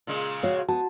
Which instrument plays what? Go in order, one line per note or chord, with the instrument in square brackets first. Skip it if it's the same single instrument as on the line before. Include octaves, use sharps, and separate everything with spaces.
[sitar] A#2 C#3 G#3
[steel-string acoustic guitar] F#4 C#5 F5
[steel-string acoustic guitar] B3 [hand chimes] F#4 A5